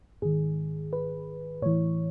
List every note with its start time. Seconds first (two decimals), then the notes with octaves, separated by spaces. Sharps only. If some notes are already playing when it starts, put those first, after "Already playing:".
0.22 G#2 D#3 G#4
0.93 B4
1.62 A2 E3 C#5